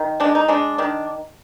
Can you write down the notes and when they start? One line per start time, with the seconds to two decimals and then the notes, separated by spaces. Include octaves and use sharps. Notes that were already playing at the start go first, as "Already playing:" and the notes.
Already playing: D#3
0.20 G#3 D4
0.35 D#4
0.48 G#3 D4
0.78 D#3 D4